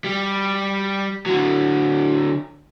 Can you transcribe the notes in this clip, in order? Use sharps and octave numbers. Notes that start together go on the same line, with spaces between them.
G3
D3 F#3